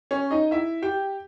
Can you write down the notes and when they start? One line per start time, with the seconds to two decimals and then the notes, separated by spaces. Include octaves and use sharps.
0.11 C#4 C#5
0.31 D#4 D#5
0.51 E4 E5
0.82 G4 G5